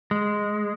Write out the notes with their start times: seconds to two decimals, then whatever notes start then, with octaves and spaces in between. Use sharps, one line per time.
0.11 G#3